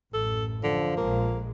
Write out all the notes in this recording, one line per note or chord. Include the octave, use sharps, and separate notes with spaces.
A1 F#2 A4
D3 F3
A#1 G#3 A#3